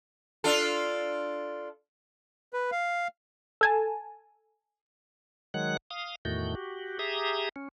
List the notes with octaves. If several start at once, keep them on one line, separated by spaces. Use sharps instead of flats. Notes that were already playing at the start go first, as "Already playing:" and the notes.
D4 F4 A4
B4
F5
A4 G#5 A5
D#3 F#3 G#3 F#5 F#6
F5 D#6
E2 A2 D#3 A3 F#4 G6
F#4 G4
G4 G#4 E5 A#5 D#6
C#4